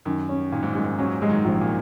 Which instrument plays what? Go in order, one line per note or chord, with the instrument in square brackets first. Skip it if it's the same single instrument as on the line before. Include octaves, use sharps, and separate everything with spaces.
[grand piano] F#2 [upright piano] D#3
[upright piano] C#4
[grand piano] A#2 [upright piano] D#3
[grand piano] G#2
[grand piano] F#2 [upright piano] G#3
[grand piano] G#2
[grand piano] F#3 [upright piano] C#4
[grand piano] F#3 [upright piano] G#3
[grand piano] D#3
[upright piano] A#1
[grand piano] A#2